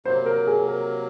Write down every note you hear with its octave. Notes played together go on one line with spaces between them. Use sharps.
C3 F#3 A#3 C5
A#4
G#4
A#4